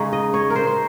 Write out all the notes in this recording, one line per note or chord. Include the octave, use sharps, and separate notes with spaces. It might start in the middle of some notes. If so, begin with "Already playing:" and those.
Already playing: C#3 G#3 D#4 C#5
D#5
C#5
A#4
C5
C5